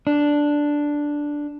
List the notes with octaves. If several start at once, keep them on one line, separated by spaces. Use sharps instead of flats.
D4